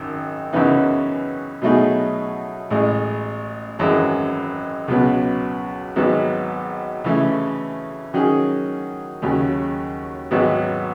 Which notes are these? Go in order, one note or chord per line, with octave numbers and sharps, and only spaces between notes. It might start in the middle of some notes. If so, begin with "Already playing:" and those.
Already playing: G#1 F#2 D#3
F#2 C#3 E3 B3 D#4
B2 F#3 A3 D#4 G#4
A1 A2 G#3
G#1 F#2 E3 G#3
C#2 B2 F#3 B3
G#1 G#2 F#3 B3
C#3 E3 A3
D#3 F#3 C#4 G#4
D#2 C#3 F#3
G#1 G#2 F#3 B3